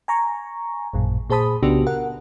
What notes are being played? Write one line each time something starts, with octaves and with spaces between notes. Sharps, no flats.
G#5 A#5 C#6
A1 F#2 A#2
A#2 G#4 C5 A5 B5 D#6
C2 C#3 B3 D4 F#4 G4
A#4 F#5